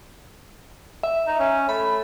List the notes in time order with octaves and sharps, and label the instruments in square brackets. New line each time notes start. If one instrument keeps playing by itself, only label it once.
[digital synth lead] E5
[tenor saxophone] D#4
C#4
[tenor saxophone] A3 [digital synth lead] B5